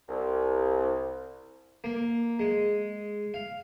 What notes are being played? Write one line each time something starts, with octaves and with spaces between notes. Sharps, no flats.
C2
A#3
G#3
F5